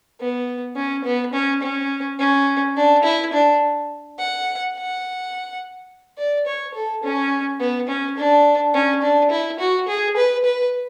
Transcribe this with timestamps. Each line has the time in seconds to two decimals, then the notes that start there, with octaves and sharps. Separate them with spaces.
0.20 B3
0.76 C#4
1.05 B3
1.33 C#4
1.62 C#4
2.19 C#4
2.76 D4
3.04 E4
3.33 D4
4.18 F#5
4.75 F#5
6.18 D5
6.46 C#5
6.74 A4
7.03 C#4
7.59 B3
7.89 C#4
8.17 D4
8.74 C#4
9.02 D4
9.30 E4
9.59 F#4
9.88 G#4
10.16 B4
10.45 B4